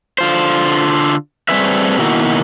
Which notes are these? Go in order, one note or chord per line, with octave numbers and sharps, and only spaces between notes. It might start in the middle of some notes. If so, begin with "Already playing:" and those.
D3 F4 C5
G3 A3 C4 G#4 B4 E5
B2 D#3 A#3 E4 F#4